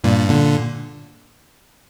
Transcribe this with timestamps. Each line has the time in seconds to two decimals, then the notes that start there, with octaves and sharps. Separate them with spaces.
0.04 G2 A#2
0.30 A#2 D3